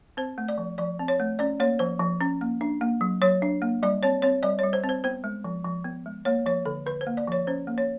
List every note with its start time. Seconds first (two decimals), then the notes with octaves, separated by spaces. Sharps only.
0.17 C4 C5
0.38 A3
0.48 D5
0.58 F3
0.78 F3 D5
0.99 C4
1.08 C#5
1.20 A3
1.39 C#4 D5
1.60 A#3 C#5
1.79 F3 C5
1.99 F3
2.21 C#4
2.41 A#3
2.61 D4
2.81 A#3
3.01 F#3
3.22 F#3 C#5
3.42 D4
3.62 A#3
3.83 G3 D5
4.03 C4 C#5
4.22 C4 C#5
4.43 G3 D5
4.59 G3 C#5
4.73 C5
4.84 C4
4.89 C5
5.04 B3 C5
5.24 G#3
5.44 F3
5.65 F3
5.84 B3
6.06 G#3
6.25 A#3 C#5
6.46 F3 C#5
6.65 D3 A4
6.86 D3 B4
7.01 C5
7.07 A#3
7.17 D5
7.27 F3 C#5
7.47 C#4 C5
7.67 A#3
7.78 C#5